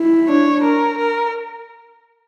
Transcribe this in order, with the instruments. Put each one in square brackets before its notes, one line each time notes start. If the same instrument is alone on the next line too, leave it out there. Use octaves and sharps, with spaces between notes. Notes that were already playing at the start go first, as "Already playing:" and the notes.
Already playing: [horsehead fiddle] E4
[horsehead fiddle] D4 [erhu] C#5
[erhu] A#4
A#4